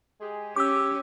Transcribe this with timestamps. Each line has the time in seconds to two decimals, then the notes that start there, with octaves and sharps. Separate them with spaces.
0.21 G#3 G4 G#4
0.56 C#4 G4 D6 E6